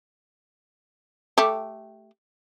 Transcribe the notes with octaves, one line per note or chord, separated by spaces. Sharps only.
A3 G4